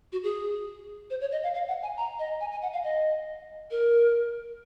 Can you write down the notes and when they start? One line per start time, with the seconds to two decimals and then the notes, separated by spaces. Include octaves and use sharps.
0.12 F#4
0.23 G#4
1.10 C5
1.21 C#5
1.32 D#5
1.43 F5
1.54 F5
1.68 F#5
1.82 G#5
1.97 A#5
2.19 D#5
2.41 G#5
2.51 G#5
2.62 F#5
2.73 F5
2.84 D#5
3.71 A#4